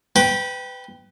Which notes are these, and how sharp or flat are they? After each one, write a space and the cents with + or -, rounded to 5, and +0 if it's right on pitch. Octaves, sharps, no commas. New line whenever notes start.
B4 +25 G5 +0 B5 -30